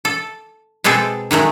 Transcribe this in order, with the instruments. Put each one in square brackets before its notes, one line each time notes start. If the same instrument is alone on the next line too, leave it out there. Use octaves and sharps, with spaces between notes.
[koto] A4
B2 G#3 C4 G#4 A4
D#3 F#3 G#3 A3